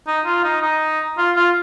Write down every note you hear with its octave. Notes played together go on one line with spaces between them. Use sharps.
D#4
F4
D#4
D#4
F4
F4